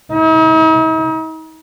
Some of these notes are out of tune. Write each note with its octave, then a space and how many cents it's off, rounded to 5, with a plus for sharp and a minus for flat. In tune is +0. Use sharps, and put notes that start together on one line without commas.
D#4 +45